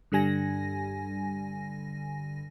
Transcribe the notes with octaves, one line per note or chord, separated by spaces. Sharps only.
G2 D3 G3 G#5 A#6